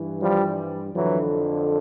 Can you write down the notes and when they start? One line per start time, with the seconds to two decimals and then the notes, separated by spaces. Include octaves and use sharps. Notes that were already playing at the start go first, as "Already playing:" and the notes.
Already playing: G2 E3
0.19 F3 G3
0.94 F2 D3 E3 F#3